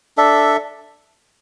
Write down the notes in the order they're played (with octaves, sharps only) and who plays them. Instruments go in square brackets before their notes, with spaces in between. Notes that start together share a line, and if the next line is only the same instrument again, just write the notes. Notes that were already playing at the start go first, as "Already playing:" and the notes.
[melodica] D4 A4 E5